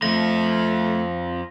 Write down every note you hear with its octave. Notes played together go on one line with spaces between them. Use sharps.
F2 F3 A3 A#6